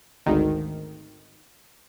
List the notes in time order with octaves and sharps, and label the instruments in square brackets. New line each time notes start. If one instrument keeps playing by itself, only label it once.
[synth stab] G#1 D2 D#3